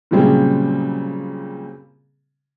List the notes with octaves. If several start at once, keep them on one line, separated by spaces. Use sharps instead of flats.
A#2 C#3 F#3 G3 C4 G#4